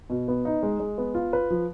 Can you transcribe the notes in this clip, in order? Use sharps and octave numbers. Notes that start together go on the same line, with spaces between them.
B2
B3
D#4
G#3
G#3
B3
F4
B4
F3